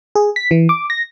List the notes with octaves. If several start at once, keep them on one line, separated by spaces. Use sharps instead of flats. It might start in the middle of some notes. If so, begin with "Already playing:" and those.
G#4
B6
E3
D6
A#6